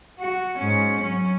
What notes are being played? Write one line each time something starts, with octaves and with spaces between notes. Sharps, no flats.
F#4
G#2 C#4
F#3 C#4